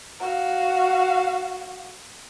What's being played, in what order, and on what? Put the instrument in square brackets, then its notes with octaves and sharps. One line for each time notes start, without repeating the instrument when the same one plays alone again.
[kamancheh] F#4 F5